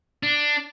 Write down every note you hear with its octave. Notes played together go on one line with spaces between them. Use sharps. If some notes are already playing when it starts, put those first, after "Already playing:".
D4